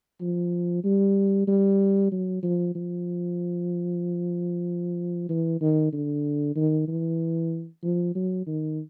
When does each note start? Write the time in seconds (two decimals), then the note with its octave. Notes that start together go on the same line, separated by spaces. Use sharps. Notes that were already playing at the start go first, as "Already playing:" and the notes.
0.21 F3
0.84 G3
1.47 G3
2.12 F#3
2.43 F3
2.75 F3
5.29 E3
5.61 D#3
5.93 D3
6.56 D#3
6.88 E3
7.83 F3
8.15 F#3
8.47 D#3